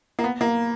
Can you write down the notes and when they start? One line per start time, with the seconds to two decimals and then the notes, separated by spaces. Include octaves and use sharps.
0.19 A#3
0.24 B3
0.41 A#3